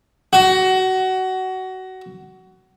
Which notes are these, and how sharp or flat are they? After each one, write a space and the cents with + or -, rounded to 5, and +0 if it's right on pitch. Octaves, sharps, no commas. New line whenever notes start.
F#4 +20